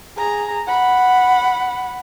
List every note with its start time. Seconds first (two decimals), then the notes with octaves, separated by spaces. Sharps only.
0.18 G#4 A#5
0.67 F#5 B5